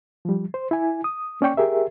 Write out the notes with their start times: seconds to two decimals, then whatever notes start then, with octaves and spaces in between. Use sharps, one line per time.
0.25 F3 G3
0.54 C5
0.71 E4 G#5
1.04 D#6
1.41 A#3 C#4 D5 G5 C#6
1.57 G4 G#4 A#4 E5